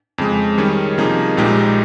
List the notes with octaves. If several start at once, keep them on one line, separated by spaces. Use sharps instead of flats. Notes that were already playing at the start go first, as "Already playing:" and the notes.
F2 C#3 G#3
D#3 G3 C#4 G#4
C3 F3 A#3 D#4 G#4
A#1 A#2 G#3 D#4 G4